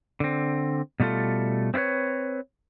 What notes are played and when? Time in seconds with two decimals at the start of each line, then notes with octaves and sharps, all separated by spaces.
0.20 D3 C4
1.00 B2 G3 A3 F4 A4
1.74 C4 E4 F4 B4 C#5